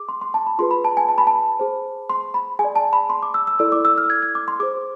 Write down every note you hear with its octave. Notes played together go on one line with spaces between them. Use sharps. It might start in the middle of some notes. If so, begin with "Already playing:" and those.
Already playing: G#4 D6
C6
C6
A5
B5
F4 G#4 B4 C6
B5
A5
G#5
A5
B5
A5
G#4 C5
C6
B5
G#4 G#5
D5
A5
B5
C6
D6
E6
E6
E4 A4 D5 E6
D6
E6
F6
G#6
G#6
D6
C6
G#4 C5 D6